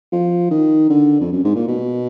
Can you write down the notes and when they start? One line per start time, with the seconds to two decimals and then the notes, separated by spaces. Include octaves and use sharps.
0.12 F3
0.51 D#3
0.90 D3
1.20 F2
1.32 F#2
1.44 G#2
1.56 A#2
1.68 B2